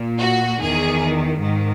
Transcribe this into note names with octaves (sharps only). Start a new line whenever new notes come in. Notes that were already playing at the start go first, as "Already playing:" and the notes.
Already playing: A#2
F#4
E2 D#3 G#4
G#2 D#3